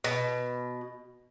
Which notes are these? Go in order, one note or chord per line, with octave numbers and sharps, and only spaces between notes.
B2